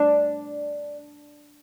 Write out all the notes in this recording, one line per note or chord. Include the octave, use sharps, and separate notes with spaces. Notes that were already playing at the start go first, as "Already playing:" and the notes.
Already playing: D4